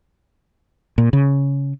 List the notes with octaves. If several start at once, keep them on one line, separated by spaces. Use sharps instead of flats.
A#2
C#3